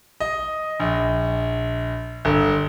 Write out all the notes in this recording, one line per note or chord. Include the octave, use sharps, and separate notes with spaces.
D#5
A#1
G1